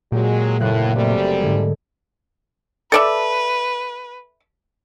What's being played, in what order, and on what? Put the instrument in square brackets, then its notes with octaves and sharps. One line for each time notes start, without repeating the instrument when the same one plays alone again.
[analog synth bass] A#2 [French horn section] F#3 G#3 [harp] G4
[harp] F#1 A#3 F#6 [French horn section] A2
[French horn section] F#2 C3 G3 [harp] A3
[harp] G#2 D3 G#3
[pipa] A4 D5 E5 [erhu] B4